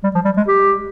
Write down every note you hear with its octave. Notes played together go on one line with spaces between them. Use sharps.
G3
F3
G3
G#3
G4